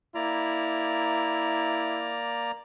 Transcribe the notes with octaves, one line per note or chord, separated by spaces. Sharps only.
A#3 E4 D5 A#5